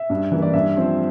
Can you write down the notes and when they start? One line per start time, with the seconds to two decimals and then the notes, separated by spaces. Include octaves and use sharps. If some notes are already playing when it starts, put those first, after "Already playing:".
Already playing: E5
0.10 G2
0.32 E3 A#3
0.42 D5
0.53 G2 E5
0.76 F3 C4